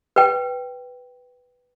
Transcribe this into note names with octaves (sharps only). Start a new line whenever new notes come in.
B4 G5